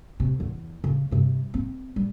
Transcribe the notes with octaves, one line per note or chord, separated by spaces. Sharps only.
C3
E2
C#3
G2 C3
C4
G3